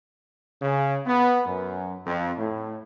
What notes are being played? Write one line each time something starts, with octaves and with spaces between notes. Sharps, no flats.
C#3
B3
F#2
F2
A2